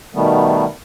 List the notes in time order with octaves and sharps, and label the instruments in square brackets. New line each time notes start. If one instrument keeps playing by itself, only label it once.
[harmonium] B2 D#3 G3 A3 B3